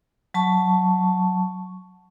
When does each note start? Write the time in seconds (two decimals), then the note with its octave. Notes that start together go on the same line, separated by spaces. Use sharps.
0.34 F#3 A5 C#6